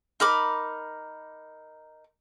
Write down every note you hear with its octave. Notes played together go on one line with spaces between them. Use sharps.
D#4 A#4 B5 D6